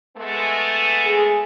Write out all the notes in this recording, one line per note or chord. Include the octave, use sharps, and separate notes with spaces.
G#3 A3 B3
G#4